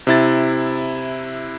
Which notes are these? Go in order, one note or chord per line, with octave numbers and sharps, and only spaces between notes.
C3 E4 A6